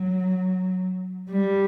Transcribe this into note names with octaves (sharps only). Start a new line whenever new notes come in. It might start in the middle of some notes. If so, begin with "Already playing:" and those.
Already playing: F#3
G3